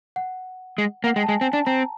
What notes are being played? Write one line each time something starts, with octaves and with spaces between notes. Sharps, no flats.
F#5
G#3
A#3 F#5
G#3 G5
A5
G#3 G#5
C4 G#5
D4 A5
C4 A#5